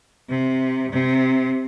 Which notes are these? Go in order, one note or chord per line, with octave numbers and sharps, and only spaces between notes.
C3
C3